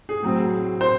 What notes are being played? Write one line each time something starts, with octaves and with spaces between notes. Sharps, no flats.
G#4
A2 F#3 C4
C5